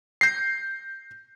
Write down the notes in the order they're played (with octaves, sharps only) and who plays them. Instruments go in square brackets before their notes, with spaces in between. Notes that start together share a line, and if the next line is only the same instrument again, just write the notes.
[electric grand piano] G6 A#6 C7